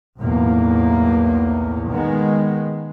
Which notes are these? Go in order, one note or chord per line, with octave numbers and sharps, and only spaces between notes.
B1 E2 A2 A#3
D#3 G#3 B3